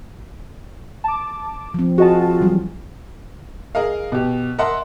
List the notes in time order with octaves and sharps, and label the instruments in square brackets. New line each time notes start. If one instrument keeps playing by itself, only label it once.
[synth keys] A5 D6
[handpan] F3 C4
[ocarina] F4 [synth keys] F#4 D#5 A5 [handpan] G#4
[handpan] E3 F#3 G3
[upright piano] G#4 A#4 D#5 F5
B2 G4
A#4 D#5 E5 F#5 A5 C6